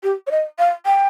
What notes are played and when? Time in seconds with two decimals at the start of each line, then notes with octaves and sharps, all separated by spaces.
0.03 G4
0.27 C#5
0.31 D#5
0.59 F5
0.86 G5